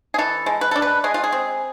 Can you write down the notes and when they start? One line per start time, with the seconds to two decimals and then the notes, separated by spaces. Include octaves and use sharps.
0.14 G#4
0.18 E3 A4
0.46 G#3
0.61 B4
0.71 D4 A4
0.82 B4
1.04 G#3 G#4
1.14 F4
1.24 G#4
1.32 C4